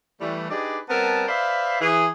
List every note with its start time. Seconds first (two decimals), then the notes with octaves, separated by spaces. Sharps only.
0.21 E3 G3 A3
0.50 D4 D#4 G4 G#4 B4 D5
0.90 G3 B3 C4 A#4 A5
1.28 B4 C5 D5 E5 F5
1.81 E3 G#4